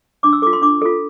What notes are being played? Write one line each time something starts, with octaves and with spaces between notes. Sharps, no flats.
D4 D6
E6
F4 A4 D6
C6
D4 D6
F4 A4